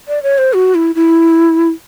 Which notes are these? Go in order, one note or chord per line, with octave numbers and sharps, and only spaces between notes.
D5
C#5
C5
F#4
E4
E4